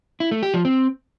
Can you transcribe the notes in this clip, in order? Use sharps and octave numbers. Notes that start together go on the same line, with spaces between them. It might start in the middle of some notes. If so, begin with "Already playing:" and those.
E4
A3
G4
F3
C4